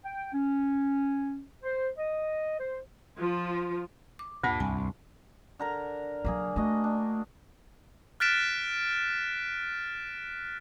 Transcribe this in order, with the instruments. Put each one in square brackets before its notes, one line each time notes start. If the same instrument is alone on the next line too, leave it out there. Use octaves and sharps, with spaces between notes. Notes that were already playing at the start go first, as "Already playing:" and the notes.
[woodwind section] G5
C#4
C5
D#5
C5
[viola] F3 F4
[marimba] D6
[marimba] D2 G2 A5 [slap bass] A#2
[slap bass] C2 [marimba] G#5
[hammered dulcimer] D3 A#4 A#5
[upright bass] C#3 F#3 [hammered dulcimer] A#3 G#4
[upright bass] A3 [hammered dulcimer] D4 F#4 D#5
[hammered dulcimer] D4
[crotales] F6 F#6 A6 B6 D7 E7